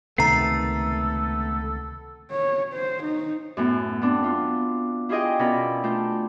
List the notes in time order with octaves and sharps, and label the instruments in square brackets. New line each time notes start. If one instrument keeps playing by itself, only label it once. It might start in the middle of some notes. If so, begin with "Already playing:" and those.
[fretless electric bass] C#2 C3 D#3 [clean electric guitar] A3 B3 [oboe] A4 [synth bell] A#5 C7
[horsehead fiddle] C#5
C5
D#4
[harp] F#2 A2 B3
B3 C4 D4
B3 F4
E4 F4 G4 G#4 D#5 G5
B2 C#4 A#4 D5 B5
A3 D4 F4 G6